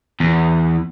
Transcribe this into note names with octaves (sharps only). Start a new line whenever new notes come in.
E2